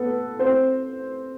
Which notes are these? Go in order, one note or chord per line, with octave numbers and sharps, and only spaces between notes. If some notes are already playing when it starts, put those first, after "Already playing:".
Already playing: B3 A4 B4
C4 C5